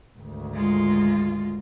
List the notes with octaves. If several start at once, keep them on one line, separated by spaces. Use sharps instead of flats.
G#1 D2
G#3 F4